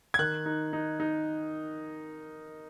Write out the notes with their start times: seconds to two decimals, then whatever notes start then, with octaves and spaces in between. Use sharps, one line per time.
0.14 G#6
0.19 D#3 F#6
0.46 D#4
0.73 D#4
1.00 D#4